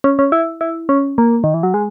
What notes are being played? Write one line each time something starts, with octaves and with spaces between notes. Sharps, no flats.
C#4
C#4
E4
E4
C#4
A#3
D#3
E3
F#3
G#3